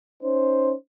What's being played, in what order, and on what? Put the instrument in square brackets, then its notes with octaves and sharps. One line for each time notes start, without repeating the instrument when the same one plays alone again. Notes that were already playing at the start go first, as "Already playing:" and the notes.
[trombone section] C#4 D#4 C5